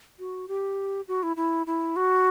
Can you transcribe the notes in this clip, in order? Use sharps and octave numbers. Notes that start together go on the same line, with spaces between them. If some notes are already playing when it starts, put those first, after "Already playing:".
F#4
G4
F#4
E4
E4
E4
F#4